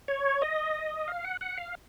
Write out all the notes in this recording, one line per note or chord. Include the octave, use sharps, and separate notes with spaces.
C#5
D#5
F5
F#5
F#5
F5